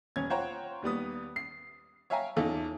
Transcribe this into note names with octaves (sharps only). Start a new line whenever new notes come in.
E1 C#4 G#6
F4 C5 C#5 F#5 G5 A#5
D#2 G3 B3 D#6
C7
C#5 E5 F5 G5 G#5 A#5
E2 C#4 D#4 F4 A4